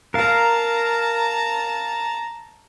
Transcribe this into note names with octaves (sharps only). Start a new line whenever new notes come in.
A#4 F5 A5 A#5